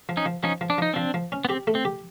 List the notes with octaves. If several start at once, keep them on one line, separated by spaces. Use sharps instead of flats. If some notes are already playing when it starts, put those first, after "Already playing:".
F3
C#4 D#4
F3
F3 C#4 D#4
F3
D4
F3 D#4
F3 C4 D4
F3
C#4
B3
C4 G4
A3
C4
G4